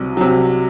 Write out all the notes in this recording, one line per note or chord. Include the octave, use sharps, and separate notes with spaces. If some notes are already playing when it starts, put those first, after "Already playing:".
Already playing: C2 C3 F#3
C3 F#3